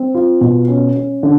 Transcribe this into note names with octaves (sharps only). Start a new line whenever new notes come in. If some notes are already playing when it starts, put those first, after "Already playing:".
Already playing: C4
F4
B2
C#4
C#4
D3